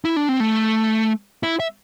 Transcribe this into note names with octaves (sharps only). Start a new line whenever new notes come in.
E4
D4
C4
A3
E4
E5